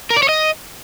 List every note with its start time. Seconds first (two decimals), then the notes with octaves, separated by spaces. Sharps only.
0.10 A#4
0.16 D5
0.23 C#5
0.29 D#5